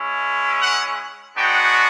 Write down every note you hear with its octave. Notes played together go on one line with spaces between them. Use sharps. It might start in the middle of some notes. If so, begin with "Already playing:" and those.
Already playing: G#3 C#4 E4
F#5
G#3 B3 D4 F#4 G5